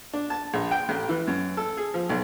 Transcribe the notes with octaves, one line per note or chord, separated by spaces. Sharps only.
D4
A5
A#1
G5
A1
E3
F#2
A4
G#4
F3
B1